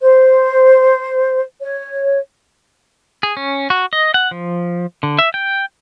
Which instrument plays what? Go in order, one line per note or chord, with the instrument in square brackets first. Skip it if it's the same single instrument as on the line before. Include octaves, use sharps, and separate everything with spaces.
[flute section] C5
C#5
[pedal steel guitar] G#4
C#4
F#4
D#5
F#5
F3
D3
E5
G5